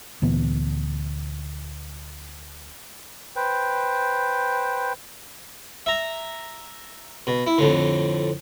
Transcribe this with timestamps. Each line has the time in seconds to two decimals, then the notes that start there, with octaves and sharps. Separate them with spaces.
0.22 D2 A#2 E3 B3
3.36 B4 C5 G5
5.86 E5 A#5
7.27 B2
7.47 E4
7.58 F2 A2 D3